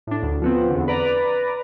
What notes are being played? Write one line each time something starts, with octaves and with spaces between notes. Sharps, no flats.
A2 D4
D2
F3 B3 C4
E2 D3
B4 D5 A#5